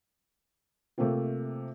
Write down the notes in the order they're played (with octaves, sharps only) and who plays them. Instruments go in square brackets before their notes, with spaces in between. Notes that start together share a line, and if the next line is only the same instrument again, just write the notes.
[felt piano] C3 A3 A#3 C4 F4